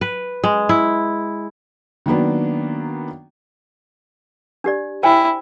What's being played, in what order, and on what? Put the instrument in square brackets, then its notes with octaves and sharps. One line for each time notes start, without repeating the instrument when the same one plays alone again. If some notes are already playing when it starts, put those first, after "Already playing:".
[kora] B4
G#3
E4
[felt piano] D#3 F#3 A#3 B3 D4
[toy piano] D4 G4 D5
[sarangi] E4 [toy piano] C5 G5 G#5